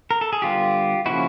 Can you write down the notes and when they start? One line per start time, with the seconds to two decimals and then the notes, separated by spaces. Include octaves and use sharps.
0.11 A#4
0.21 A4
0.33 G#4
0.42 D3 G3 B3 F4 G4
1.06 C#3 F3 A#3 C#4 E4 F#4